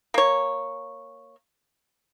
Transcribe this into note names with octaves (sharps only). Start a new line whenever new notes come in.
A#3 C#5